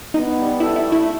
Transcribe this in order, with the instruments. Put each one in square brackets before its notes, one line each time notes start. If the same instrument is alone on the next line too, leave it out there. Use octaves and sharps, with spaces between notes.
[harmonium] B3 [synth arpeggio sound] D#4
[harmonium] G3
[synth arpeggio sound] E4 [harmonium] A4
[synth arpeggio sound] E4
[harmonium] A3
[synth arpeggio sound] E4